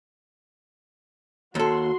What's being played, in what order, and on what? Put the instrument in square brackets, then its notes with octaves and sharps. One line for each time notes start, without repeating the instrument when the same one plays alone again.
[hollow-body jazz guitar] D#2 A4 [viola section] F#4 C6